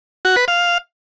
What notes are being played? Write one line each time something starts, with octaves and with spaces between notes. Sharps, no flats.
F#4
B4
F5